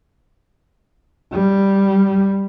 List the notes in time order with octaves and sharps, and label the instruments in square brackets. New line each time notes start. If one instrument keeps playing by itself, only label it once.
[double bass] G3